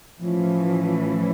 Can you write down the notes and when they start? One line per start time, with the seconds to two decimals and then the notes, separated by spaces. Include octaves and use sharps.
0.19 A2 E3 F3 A3 C#4 E4
1.04 F3